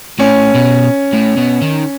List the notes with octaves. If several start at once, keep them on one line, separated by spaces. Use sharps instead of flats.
A2 C#4
B2
A2
B2
D#3